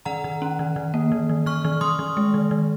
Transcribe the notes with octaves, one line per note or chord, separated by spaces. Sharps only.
D#3 F#5 A#5
D#3
C#4
D#3
D#3
A#3
D#3
D#3
D#3 C#6 F6
D#3
D#3 C6 D#6
D#3
G#3
D#3
D#3